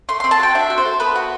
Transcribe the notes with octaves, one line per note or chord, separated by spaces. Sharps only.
A3 C6
C4 C6
A5
F#4 G5
D4 E5
F#4
C5
A4
B3 B4
F#4